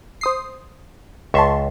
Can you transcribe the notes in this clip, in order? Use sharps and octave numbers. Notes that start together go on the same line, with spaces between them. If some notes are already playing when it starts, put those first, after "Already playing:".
C5 D#6 C7
C#2 E5 A5 C6 C#6